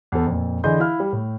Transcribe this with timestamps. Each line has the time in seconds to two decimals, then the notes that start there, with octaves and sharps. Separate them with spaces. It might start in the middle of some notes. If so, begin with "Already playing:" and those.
0.12 E2 A4
0.26 F2 A#2
0.64 D3 E3 G#4 D#5 C6 G6
0.80 E4 F5 F6
1.00 G3
1.12 A2